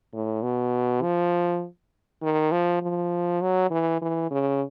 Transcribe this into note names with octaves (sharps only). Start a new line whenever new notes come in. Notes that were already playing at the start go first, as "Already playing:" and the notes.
A2
B2
F3
D#3
F3
F3
F#3
E3
E3
C#3